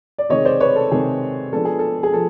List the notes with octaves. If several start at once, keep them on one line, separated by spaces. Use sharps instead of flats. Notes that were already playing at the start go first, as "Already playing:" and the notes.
D5
C3 D#3 G#3 C#5 D#5
C5 D5
B4 C#5
A4
C3 D#3 G#3 G#4
F3 G#3 B3 D4 A4
G#4
A4
G#4
F3 A4